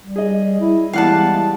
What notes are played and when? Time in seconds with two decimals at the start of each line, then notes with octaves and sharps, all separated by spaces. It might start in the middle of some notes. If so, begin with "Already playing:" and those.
0.01 G3
0.16 G#4 D#5
0.60 E4
0.93 E3 G3 G#3 B3 F5 F#5 A5